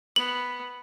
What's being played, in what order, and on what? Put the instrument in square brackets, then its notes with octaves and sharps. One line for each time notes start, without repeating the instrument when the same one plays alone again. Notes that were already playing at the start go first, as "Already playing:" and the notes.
[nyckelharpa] B3 [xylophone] F#7